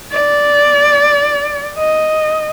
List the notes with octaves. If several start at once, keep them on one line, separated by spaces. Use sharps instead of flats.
D5
D#5